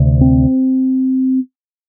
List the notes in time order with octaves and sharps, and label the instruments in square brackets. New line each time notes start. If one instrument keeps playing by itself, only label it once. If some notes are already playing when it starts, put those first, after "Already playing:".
Already playing: [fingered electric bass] D2 C3
C4